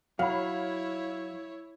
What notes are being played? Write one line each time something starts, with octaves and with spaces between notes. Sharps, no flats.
F#3 E4 C#5 F5 B5